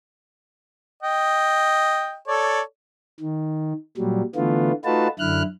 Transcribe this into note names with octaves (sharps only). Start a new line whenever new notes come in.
D#5 G5
A4 C#5 D5
D#3
A#2 F#3 G3
D3 E3 A3 B3 F4
A3 D#4 F4 F#4 B4 A5
F#2 D3 E4 F6 F#6